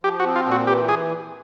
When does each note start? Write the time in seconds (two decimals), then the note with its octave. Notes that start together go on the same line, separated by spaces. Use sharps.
0.04 F3 G4
0.20 F#4
0.25 C4
0.36 F4
0.46 A#2
0.52 F#4
0.67 E3 G4
0.89 G#4